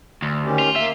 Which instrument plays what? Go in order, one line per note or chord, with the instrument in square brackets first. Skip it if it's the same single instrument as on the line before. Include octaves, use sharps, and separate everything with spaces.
[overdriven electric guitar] D2
[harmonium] D#3 C#4 G4
[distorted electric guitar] F4
[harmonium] A#3 [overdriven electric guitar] E5